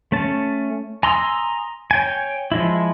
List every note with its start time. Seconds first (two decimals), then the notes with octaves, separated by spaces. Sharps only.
0.12 A3 C#4 A5
1.03 G#5 A#5 C6 D#6 E6
1.91 C#5 G5 G#5
2.52 F3 G#3 E4